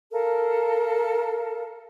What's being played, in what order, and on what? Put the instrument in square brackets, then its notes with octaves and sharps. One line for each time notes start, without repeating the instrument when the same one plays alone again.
[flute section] A4 A#4 F5